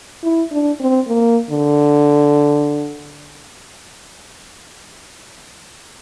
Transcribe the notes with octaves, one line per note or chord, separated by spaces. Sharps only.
E4
D4
C4
A#3
D3